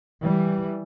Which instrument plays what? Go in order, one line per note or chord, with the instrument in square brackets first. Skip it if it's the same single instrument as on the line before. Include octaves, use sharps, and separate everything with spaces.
[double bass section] E3 G3